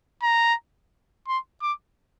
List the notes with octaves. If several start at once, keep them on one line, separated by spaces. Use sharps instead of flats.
A#5
C6
D6